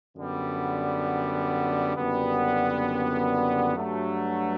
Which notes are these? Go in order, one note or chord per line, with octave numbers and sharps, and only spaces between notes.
F#2 D3 G3 B3
F#1 F#2 D3 G3 B3
G2 F#3 A3